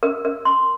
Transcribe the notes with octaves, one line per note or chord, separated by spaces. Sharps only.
A#4
A#4
C6